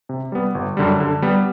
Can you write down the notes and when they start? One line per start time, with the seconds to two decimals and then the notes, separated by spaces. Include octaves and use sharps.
0.09 C3
0.32 G3 B3
0.55 G1
0.77 F#2 D3 G3
1.00 D3
1.22 G3 B3